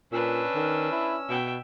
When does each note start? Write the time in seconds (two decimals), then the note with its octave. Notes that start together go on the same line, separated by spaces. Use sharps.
0.12 A#2 C#4 D4 B4 E6
0.55 D#3
0.92 E4
1.29 B2 E5 G5